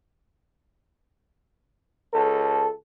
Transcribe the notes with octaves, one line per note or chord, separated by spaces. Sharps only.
C#2 A4